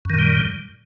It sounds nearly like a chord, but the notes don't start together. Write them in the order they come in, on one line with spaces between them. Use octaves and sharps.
F#2 D#3 A#2 G3